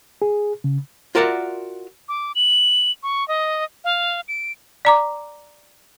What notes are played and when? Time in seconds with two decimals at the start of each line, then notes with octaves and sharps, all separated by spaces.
0.22 G#4
0.64 C#3
1.15 F4 F#4 A#4 D5 E5 F#5
2.09 D6
2.35 F#7
3.03 C#6
3.28 D#5
3.84 F5
4.28 D7
4.85 D5 A#5 D6